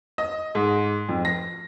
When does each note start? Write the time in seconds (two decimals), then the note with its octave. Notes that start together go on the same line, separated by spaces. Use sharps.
0.18 D#5
0.55 G#2
1.09 F2
1.25 A#6